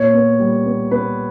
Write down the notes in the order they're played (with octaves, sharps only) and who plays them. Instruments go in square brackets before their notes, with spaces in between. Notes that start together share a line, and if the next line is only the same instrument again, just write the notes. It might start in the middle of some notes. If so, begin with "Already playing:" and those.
Already playing: [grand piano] A#2 C#5
B3
G3
B3
B3 B4